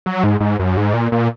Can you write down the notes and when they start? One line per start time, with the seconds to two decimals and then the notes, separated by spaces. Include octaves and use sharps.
0.06 F#3
0.24 G#2
0.40 G#2
0.59 F#2
0.77 G#2
0.94 A#2
1.12 A#2